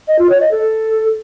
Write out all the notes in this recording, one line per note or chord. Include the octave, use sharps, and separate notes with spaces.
D#5
F4
C#5
D#5
A4